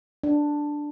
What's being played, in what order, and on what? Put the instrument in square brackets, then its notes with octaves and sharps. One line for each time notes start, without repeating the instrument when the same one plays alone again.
[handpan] D4